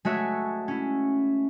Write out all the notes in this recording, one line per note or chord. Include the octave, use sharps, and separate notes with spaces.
G#3 A3 F#4 C#5 E5
C#4 E4